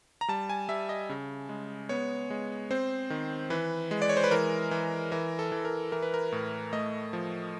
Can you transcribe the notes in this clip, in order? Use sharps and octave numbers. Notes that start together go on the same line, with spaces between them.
A#5
G3 A5
G#5
G3 E5
D#5
C#3
G#3
B3 C#5
G#3
C4 C5
D#3
E3 B4
G#3
D5
C#5
C5
B4
E3 A#4
E3
E3 A#4
A4
E3
A#4
E3 A#4
B4
A#4
A2
A3 D#5
F3